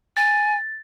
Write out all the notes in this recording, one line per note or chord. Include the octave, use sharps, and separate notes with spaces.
G#5 A6